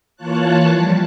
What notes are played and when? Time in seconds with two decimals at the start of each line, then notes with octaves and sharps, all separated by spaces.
0.16 E3 A#3 F4 C#5 A5 F#6
0.67 F3 G3